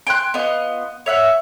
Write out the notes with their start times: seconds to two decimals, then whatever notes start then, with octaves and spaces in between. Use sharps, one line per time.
0.07 G5 G#5 C6 F#6
0.34 B3 F4 D#5
1.06 C#5 E5 F#5